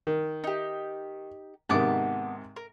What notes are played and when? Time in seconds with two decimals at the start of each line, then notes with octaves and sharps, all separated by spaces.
0.07 D#3
0.44 D#4 G4
1.69 G#2 C3 D#3 B3 A5 D6
2.56 A#4